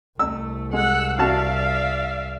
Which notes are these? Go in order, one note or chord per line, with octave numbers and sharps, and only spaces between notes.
C2 A3 E6
G#3 F#5 E6 F#6
F#4 D5 E5 F5 A5